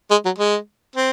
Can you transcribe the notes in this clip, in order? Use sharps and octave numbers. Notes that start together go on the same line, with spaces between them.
G#3
F#3
G#3
C4